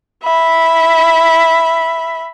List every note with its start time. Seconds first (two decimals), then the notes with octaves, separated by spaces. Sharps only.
0.24 E5 B5